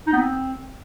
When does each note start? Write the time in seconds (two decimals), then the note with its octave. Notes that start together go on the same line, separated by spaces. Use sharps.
0.07 D#4
0.13 B3
0.19 C4